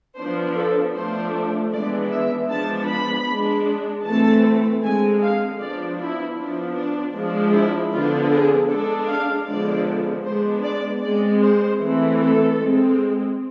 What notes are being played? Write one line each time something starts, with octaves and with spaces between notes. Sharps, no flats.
F3 B3 D4 C5
A4
F3 A3 D4 C5
E3 G#3 B3 D4 D5
E5
F3 G#3 B3 D4 A5
B5
G#3 D4
E3 A3 C4 A5
D3 G#3 C4 G#5
F5
F3 B3 D4 D5
E4
F3 B3 D4
D4
F3 G#3 D4
E4
D3 F3 B3 D4 F4
G#4
G#3 D4 A4
F5
D3 F3 G#3 B3 D4 D5
G#3 B3 D4 C5
D5
G#3 C4 D5
C5
E3 A3 C4
A4
G#3 C4